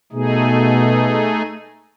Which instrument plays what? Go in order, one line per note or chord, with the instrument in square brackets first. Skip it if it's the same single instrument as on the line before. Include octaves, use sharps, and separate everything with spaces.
[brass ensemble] B2 [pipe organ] A3 D#4 G#4